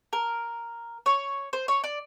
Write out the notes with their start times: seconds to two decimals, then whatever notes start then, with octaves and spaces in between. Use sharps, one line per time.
0.13 A#4
1.06 C#5
1.53 C5
1.68 C#5
1.84 D5